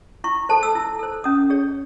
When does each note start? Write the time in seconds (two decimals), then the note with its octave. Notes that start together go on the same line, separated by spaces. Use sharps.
0.24 E4 C#6
0.49 A4 C5 A5
0.63 E6
0.75 E4
0.99 A4 C5
1.24 C#4 D#6
1.50 G#4 C#5